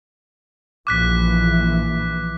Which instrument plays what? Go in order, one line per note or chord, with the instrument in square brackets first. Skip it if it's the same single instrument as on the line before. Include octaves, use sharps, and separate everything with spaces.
[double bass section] A#1 E3 [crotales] D6 F#6 B6